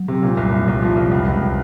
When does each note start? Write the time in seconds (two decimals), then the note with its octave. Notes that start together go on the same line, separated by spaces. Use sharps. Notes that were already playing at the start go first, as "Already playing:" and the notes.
Already playing: F#3
0.08 C3
0.23 A#2
0.37 C2
0.52 C2
0.68 C2
0.82 F3
0.97 C2
1.12 C#2
1.28 C#2